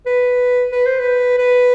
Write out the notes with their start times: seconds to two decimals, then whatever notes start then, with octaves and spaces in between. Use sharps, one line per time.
0.06 B4
0.73 B4
0.86 C5
1.00 B4
1.39 B4